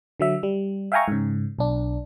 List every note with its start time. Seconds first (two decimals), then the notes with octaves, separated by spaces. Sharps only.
0.20 D3 F#3 E5
0.43 G3
0.92 E5 F5 G5 G#5 A#5 C#6
1.08 G#2 C#3
1.59 B1 D4